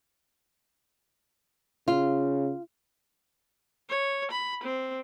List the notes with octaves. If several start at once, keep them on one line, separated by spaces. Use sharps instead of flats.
C#3 F4
C#5
B5
C4